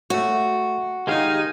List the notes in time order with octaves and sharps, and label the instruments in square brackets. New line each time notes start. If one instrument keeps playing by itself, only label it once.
[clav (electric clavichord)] A3 C#5 [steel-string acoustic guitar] F#4
[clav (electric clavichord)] D#3 [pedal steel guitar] G#3 G4 F5 [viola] D#4 G#5